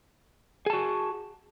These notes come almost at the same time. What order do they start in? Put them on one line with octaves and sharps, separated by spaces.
G#4 A5 F#4